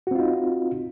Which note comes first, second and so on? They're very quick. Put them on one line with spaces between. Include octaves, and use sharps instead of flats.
F#4 C4 F4 D#4